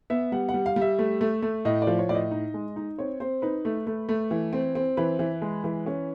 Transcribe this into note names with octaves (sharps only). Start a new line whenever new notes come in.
B3 E5
G3 F#5
F#5
G3
F5
G3
E5
A3
A3
A3
A2 D#5
D5
F3
C#5
A2 D5
D#5
D#4
G#3
D#4
C4 C#5
C4 C5
D#4 B4
A3
A3
A3
E3
C4
C4
E3 B4
E3
G#3
E3
C#4